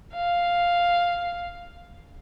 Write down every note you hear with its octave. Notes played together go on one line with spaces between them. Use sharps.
F5